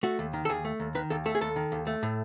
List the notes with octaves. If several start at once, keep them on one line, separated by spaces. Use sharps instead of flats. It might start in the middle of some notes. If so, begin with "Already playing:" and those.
A3 F#4
D#2
D#3
A4
D#2 G#4
A3
D#2
D#3 B4
D#2 A4
A3 A4
G#4
D#2 A4
D#3
D#2
A3
A2